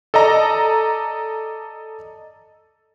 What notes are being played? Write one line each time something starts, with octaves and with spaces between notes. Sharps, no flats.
A4 D5 D#5 A#5